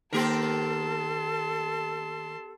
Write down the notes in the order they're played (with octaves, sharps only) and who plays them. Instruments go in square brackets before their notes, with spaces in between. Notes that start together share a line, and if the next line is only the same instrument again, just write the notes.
[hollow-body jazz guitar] D#3 A#3 [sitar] B3 G4 A#4 [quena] A4 [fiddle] A5 C6